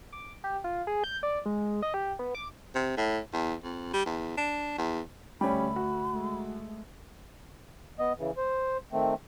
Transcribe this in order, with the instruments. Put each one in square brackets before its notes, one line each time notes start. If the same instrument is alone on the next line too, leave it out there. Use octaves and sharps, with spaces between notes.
[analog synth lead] D6
G4
F4
G#4
G6
D5
G#3
D#5
G4
B3
D6
[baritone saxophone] C3
A2
E2
F2
G3
E2
D4
E2
[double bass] D2 A3 [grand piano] G3 C#4 [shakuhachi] B5
[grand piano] F#4
[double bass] G#3 A3
[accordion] B3 D#5
C#3 E3
C5
D#3 A3 C4